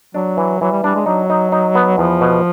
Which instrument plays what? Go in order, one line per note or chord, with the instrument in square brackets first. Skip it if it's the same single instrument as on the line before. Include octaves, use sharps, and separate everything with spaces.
[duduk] F#3 [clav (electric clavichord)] D4
[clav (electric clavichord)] E3
[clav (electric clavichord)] E3 [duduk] F#3
[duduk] G3
[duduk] G3 [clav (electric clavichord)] D4
[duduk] G#3
[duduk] F#3 [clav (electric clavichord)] D#4
[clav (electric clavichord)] D#4
D#4
B3
[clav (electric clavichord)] E2 [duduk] F3
[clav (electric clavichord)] B2